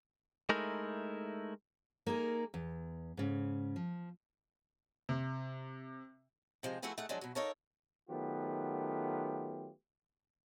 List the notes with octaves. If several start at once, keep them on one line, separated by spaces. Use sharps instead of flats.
G#3 A3 D#4 E4 A#4
A#3 D#4 G#4 A#4
E2
G#2 C#3
F3
C3
C3 F3 G#3
F3 A3 E4 F#4 G#4 B4
A3 D#4 G#4 F#5
F3 F#3 G#3 D4
B2 F#3
D#4 A4 A#4 C#5 F5 A5
D#3 F#3 A3 B3 F4 G4